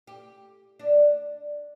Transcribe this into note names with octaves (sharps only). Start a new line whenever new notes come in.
G4
D4